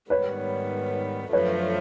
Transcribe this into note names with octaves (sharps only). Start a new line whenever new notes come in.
G#2 D#3 G3 B3 B4 C#5
F#2 D3 F3 A3 B4 C#5